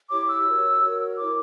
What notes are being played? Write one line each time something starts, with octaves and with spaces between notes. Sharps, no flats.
E4 G4 C#5 D6
E6
F#4 A#4 C#5
F#4 A#4 C#5
E4 A#4 C#5 D6